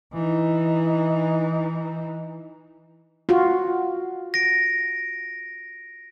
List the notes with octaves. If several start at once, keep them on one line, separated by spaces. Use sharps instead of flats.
E3 D#4
F4 F#4
A#6 D7